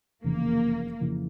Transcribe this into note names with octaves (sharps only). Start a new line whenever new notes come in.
F1 E2 C#3 A#3
F2 C#3 E3